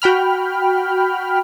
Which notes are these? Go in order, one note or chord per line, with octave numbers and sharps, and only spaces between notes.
F#4 G5 B5 F6